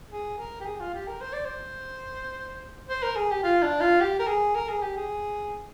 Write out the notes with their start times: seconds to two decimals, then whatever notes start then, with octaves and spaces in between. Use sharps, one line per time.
0.10 G#4
0.38 A#4
0.60 G4
0.65 G#4
0.80 F4
0.94 G4
1.08 A#4
1.21 C5
1.33 D5
1.45 C5
2.89 C5
3.03 A#4
3.16 G#4
3.31 G4
3.43 F4
3.63 D4
3.81 F4
4.00 G4
4.19 A#4
4.27 G#4
4.55 A#4
4.69 G#4
4.82 G4
4.97 G#4